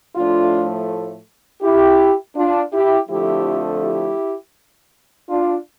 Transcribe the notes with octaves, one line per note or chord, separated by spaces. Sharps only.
A2 F3 A3 D4 F4
E4 G4
D4 F4
E4 G4
F2 D3 F3 A3 E4 G4
E4 G4
D4 F4